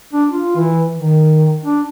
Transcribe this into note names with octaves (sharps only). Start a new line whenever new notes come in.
D4
F4
E3
D#3
D4